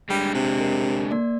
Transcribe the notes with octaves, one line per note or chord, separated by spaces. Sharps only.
D3 G3 G#3
C3
A#4
A#3 D5